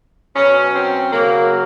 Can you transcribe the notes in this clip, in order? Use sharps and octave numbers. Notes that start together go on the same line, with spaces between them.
B2 F#3 C#4
C4
C#3 F#3 A#3